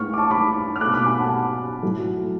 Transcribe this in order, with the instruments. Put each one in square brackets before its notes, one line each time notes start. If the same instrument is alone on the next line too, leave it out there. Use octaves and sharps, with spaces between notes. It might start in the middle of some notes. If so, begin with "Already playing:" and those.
Already playing: [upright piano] A2 G#3 C#6 F6
D6
A5 C#6
B5 D6
F6
A3 D6 F#6
B2
B5 D6
G#5 B5
F#5 A5
A2 F#3 A3